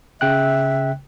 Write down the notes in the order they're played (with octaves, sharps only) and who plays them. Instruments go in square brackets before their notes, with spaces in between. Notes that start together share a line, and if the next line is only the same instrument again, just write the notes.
[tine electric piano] C#3 G5 F#6 [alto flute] E5